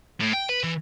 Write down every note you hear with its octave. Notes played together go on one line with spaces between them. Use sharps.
A2
G5
B4
E3